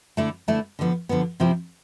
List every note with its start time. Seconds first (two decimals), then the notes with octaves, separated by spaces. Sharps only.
0.17 D3 A3 E4
0.48 D3 A3 E4
0.79 D3 F3 B3
1.09 D3 F3 B3
1.40 C3 F3 C4 E4